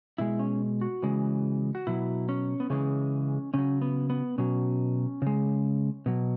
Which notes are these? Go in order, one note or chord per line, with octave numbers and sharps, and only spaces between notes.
B2 G#3 E4
C#4
F#4
C#3 E3 G#3
F#4
B2 F#3 E4
C#4
B3
C#3 E3 G#3 C#4
C#3 F#3 C#4
B3
B3
B2 F#3 C#4
C#3 G#3
B2 F#3